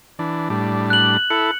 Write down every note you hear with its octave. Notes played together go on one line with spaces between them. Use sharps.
E3 D4
A2 G3 D4
F#6 F#7
E4 A4 C#7